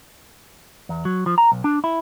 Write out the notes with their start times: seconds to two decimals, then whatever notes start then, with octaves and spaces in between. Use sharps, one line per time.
0.89 E2
1.05 F#3
1.26 F3
1.38 A#5
1.52 B1
1.64 D4
1.84 E4